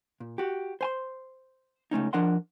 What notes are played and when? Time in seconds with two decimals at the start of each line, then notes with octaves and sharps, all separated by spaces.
0.20 A#2
0.38 F#4 G4
0.81 C5 G#5 C6
1.91 C#2 A3 C#4 D#4
2.13 F3 D4 A#4 D#5 F#5 C6